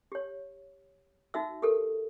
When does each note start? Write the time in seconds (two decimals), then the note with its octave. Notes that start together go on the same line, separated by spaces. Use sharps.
0.12 G4 C#5
1.34 D#4 F#4 E5 E6
1.62 G4 A4 A#4